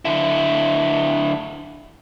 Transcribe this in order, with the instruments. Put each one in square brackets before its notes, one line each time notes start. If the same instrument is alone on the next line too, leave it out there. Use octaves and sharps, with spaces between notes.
[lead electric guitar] D3 E4